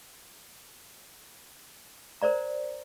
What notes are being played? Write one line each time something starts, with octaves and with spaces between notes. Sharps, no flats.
A#4 C5 D5 A#5